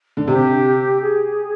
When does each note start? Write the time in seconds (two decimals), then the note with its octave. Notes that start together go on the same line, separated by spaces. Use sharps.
0.17 D3
0.28 C3 G4
1.01 G#4